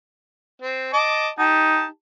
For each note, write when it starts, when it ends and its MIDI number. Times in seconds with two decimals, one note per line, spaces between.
0.62 0.92 60
0.93 1.29 75
0.93 1.29 81
0.93 1.29 86
1.39 1.86 63
1.39 1.86 67
1.39 1.86 81